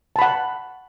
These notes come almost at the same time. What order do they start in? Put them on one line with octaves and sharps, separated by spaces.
A5 B5 F#5